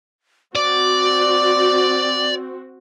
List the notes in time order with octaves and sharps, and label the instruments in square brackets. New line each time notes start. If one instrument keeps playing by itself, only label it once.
[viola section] C4 F#4 [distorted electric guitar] D5 [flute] D6